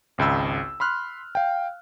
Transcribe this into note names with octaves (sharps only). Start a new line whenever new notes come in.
G#1 C#2 B5 E6
B5 C6 F6 F#6
F5 G5